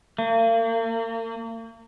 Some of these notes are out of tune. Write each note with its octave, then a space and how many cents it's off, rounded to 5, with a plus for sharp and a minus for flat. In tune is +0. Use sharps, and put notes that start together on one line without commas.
A#3 -40